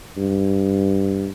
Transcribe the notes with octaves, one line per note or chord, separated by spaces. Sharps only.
G2